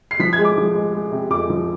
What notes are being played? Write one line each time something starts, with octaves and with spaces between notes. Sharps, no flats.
C7
F3 B6
G#6
G#3
D6
F3
G#3
G#3
C3
F2 D6
F3